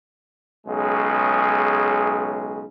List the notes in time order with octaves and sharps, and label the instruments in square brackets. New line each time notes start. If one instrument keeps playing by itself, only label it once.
[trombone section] B1 C#3 G#3